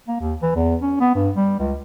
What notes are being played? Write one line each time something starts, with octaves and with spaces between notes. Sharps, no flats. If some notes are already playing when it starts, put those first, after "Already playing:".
A#3
D#2
E3
E2
C#4
B3
G2
G3
C#2